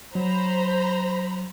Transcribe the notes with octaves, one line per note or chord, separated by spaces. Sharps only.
F#3 C5 A#5 B5